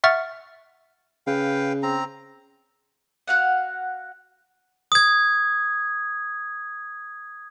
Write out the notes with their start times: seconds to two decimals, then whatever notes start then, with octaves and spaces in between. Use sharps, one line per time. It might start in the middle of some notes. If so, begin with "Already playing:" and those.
0.04 E5 F#5 C#6 F6 A6
1.27 C#3 B4 F5 G5
1.83 C4 A#5
3.28 F#4 F5 F#5
4.92 D#6 G#6